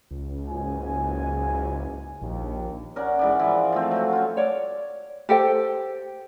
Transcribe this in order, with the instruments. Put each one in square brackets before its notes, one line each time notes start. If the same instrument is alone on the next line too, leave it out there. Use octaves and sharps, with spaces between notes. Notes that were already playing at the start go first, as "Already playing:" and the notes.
[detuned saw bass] C#2
[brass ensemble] F#1 G#2 G#5
[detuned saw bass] A#1 [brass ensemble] D#2
[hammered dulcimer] C#4 A#4 D5 F#5
G#2 E3 D5
E3 F3 E4
F3 A3 C4
F#3 F#4
C#4 F4
[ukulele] C#5 D5
G4 A4 C5 G5